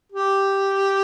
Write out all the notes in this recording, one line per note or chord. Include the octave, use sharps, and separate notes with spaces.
G4